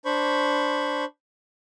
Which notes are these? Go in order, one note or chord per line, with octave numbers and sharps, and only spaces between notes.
D4 C5 B5 C#6